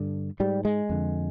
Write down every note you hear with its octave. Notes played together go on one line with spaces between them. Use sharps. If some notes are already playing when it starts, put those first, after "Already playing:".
Already playing: G2 D3
G#2 G3
G#3
F2 D3